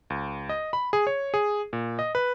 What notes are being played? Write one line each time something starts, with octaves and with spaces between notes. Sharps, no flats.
C#2
D#5
B5
G#4
C#5
G#4
A#2
D#5
B4